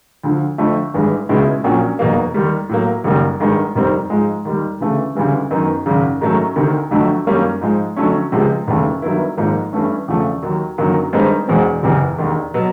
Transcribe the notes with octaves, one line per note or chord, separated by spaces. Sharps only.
D2 D3 F3
F2 D3 F3 A3
G#1 G2 E3 G#3
C#2 B2 G#3 C#4 E4
A#1 A#2 F#3 A#3 C#4
F1 E2 B2 F#3 A#3
D#2 D#3 G3
A2 F#3 A#3
F#1 F#2 D#3 G3 A#3
G#1 G2 D#3 G#3
F1 D#2 D#3 G3 C4
G#2 F3 G#3
D#2 D#3 G3
D2 C#3 E3 A3
D2 C#3 E3 G3
F#2 D#3 F#3 B3 D#4
G#1 F#2 C#3
G#2 D#3 F#3 A3 C#4
D2 C3 D#3
G1 F2 D3 F#3 A3
F#2 D#3 G3 A#3 C#4
G#2 F3 G#3
F2 D3 F#3 A3 C#4
C#2 C3 F3 G#3 C4
F1 D#2 C#3 E3 A3
G2 D#3 F#3 B3 E4
G#1 G#2 F3 A#3
G2 E3 A3 C#4
E1 E2 C#3 F3 A3
D#2 D#3 F#3
G1 F#2 D#3 F#3 A#3
G2 D#3 G#3 C4 D#4
E1 E2 B2 G#3 C4
F#1 E2 C3 E3
E1 D#2 D#3
B2 F#3 B3